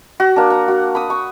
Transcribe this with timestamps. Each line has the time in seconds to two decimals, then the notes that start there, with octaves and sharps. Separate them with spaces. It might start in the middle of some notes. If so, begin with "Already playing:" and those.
0.20 F#4
0.36 A#3 D4
0.50 A#5
0.68 F#4
0.95 B5 D#6
1.10 C#6